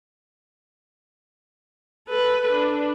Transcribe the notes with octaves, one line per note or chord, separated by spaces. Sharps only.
A4 B4
D4